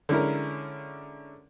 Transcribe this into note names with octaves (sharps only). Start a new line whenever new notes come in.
D3 G#3 C#4 E4 A#4